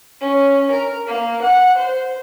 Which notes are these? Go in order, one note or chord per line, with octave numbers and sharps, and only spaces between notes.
C#4
A#4
A#3
F#5
C5